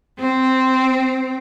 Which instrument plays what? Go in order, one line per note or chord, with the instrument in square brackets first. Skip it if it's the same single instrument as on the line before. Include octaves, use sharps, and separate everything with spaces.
[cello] C4